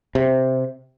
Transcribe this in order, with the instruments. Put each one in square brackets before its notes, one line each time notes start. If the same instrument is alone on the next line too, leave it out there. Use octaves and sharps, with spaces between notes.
[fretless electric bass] C3